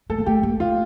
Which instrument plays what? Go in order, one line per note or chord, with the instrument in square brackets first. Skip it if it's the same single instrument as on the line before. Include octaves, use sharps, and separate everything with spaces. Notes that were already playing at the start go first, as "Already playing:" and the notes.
[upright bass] A3 [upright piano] A4
[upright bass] A#3
[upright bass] A3 [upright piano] G4
[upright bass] A#3
[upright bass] A3 [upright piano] F4